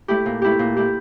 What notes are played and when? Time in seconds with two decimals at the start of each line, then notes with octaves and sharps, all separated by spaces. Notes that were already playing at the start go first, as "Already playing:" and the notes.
0.08 A3 E4 G4
0.26 A#2
0.42 A3 E4 G4
0.59 A#2
0.77 A3 E4 G4